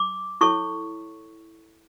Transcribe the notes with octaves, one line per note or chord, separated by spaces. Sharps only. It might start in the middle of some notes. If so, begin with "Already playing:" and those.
Already playing: D6
E4 A4 C#5 C#6